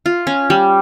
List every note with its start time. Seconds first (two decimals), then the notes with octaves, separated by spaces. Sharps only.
0.06 F4
0.27 C#4
0.50 G3